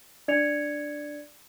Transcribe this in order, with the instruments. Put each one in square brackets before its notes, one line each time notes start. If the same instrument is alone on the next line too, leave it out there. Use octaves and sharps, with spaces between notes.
[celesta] D4 D5 G#6 C#7 F7